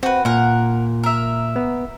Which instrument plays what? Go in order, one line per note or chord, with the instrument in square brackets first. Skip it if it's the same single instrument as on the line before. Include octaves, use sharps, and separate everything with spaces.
[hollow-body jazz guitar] C4 [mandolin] F#4 B4
[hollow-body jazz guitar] A#2 [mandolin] A#4 F#5
[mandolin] A#4 E5
[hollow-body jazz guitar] B3